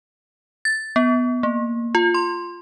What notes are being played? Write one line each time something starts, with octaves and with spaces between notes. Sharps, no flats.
A6
B3
A#3
F4
C6